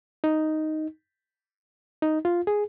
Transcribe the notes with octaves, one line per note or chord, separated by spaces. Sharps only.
D#4
D#4
F4
G#4